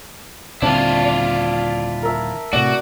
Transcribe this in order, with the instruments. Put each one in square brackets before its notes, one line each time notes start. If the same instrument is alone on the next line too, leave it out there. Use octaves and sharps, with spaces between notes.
[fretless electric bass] D#1 D3 C4 [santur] D4 [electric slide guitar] E4 F4 [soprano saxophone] D5
[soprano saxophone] D5
[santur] A#4 E5
[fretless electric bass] A2 C3 [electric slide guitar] F#4 [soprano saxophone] D5